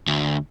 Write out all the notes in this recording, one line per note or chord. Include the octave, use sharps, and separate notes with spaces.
D2